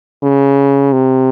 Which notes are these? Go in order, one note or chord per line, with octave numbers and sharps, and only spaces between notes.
C#3
C3